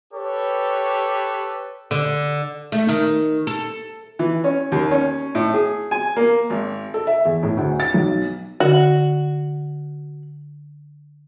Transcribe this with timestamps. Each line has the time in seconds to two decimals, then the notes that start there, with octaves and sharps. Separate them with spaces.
0.13 G4 A4 B4 C#5
1.91 D3
2.72 A3
2.89 D#3
3.47 A4
4.19 E3
4.44 C#4
4.72 D#2
4.91 C#4
5.35 A2
5.54 G#4
5.91 G#5
6.17 A#3
6.50 G#1
6.94 A4
7.07 E5
7.25 E2
7.43 A2
7.57 D2
7.80 A6
7.94 B1
8.60 D3 F#4